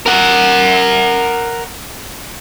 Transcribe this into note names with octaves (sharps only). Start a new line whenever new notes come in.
A#4 F#5